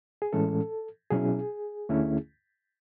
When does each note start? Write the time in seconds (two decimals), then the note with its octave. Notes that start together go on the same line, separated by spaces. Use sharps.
0.22 G#4
0.33 A2 E3 G#3 C#4 A4
1.10 B2 F#3 C#4 E4 G#4
1.89 D2 D3 A3 C#4 E4